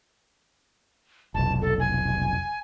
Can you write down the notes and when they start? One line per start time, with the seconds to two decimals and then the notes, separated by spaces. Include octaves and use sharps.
1.34 F1 B1 A5
1.61 A4
1.80 G#5